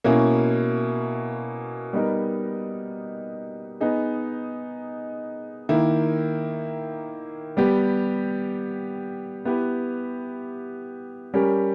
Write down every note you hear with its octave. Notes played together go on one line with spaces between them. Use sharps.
B2 A#3 C#4 E4
G3 B3 D#4 A#4
B3 D#4 G#4
D#3 A#3 E4
G3 B3 G4
B3 E4 G4 B4
G3 C#4 G4 A#4